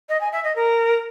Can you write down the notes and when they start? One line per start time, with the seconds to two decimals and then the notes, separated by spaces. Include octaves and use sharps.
0.09 D#5
0.21 G#5
0.32 E5
0.44 D#5
0.56 A#4